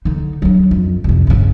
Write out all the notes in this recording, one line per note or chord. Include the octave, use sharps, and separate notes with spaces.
D3 D#4
F#3 D4
F2
C2 F2
G1 C#3